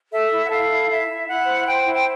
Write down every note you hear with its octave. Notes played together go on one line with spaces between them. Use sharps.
A4 E5
E4
F#5
A4 F5
E4
E4 E5
E4
E4 F#5
C5
C5 G5
E4
G5